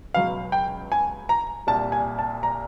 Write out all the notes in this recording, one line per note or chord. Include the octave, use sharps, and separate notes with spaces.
C#2 B2 F#3 F5
G5
G#5
A#5
C2 A#2 G3 A5
G#5
A5
A#5